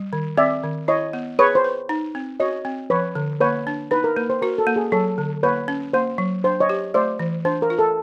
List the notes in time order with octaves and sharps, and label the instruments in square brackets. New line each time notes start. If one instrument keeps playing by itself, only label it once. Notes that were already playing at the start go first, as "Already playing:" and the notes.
Already playing: [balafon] G3
D#3
[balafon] C4 [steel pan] D5 E5
[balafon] D#3
[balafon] E4 [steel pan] C#5 D#5
[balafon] B3
[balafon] G#4 [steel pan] B4 C#5
[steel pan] C5
[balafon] B4
D#4
C4
[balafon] F#4 [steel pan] C#5 D#5
[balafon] C4
[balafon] F3 [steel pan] B4 C#5
[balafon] D3
[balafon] A#3 [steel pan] B4 C#5
[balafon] D4
[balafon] D#4 [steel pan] B4
[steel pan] A#4
[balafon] A#3 [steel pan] B4
[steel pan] C5
[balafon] F#4 [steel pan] A#4
[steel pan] A4
[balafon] A#3
[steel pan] G#4
[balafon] F#3 [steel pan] A4
[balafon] D3
[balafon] A#3 [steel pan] B4 C#5
[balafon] C#4
[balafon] A#3 [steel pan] C5
[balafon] F#3
[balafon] D4 [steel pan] C5
[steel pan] C#5 D#5
[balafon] G4
[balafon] A3 [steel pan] C5 D5
[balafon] E3
[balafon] D4 [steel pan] C5
[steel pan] A#4
[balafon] F4
[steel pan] A4